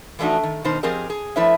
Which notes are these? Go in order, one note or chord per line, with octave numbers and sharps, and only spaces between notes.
E3 F3 A3 D4 D#4 F#4
D#3
B2 D#3 D#4 C5
F3 C4 G4 G#4 A#4 D#5
G#4
F3 A3 E4 B4 C#5 E5